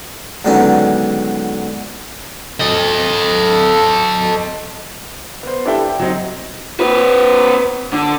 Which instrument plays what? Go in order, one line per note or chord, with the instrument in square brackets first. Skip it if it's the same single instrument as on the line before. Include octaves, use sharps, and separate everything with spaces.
[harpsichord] C#2 D3 D#3 F#3 B3 C#4
[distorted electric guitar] A4 D#5
[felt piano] B3 C5
D4 E4 G4 A4 E5 G5
G5
F#3 C4 D#4
[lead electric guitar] C4 B4
D3